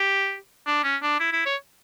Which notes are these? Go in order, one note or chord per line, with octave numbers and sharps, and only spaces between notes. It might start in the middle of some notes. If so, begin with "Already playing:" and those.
Already playing: G4
D4
C#4
D4
E4
E4
C#5